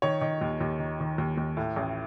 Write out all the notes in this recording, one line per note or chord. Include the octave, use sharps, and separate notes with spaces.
D#3 C#5
D#3
D#2
D#2
D#3
D#3
D#2
D#2
A2
A1